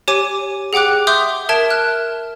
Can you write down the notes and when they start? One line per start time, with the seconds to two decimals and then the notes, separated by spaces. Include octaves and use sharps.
0.08 G4 C#5 G#5 D6 D#7
0.73 G#4 F#5 G5 D6 F#6
1.07 E5 C6 D6 D#6 G6
1.49 A#4 E5 A5 G#6 D7 E7
1.70 F6 F#6